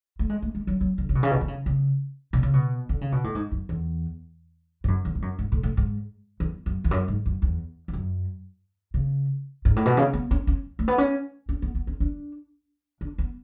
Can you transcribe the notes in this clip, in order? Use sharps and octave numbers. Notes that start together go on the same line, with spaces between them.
A3
G#3
A3
G#3
F#3
F#3
D3
C#3
B2
C#3
B2
D3
C#3
C#3
B2
C#3
B2
D3
C#3
B2
A2
G#2
F#2
E2
G#2
F#2
E2
G#2
F#2
G#2
A2
A2
G#2
E2
F#2
E2
F#2
G#2
F#2
E2
E2
F#2
C#3
G#2
A2
B2
C#3
B3
C#4
C#4
A3
B3
C#4
C#4
B3
B3
C#4
D4
D4
B3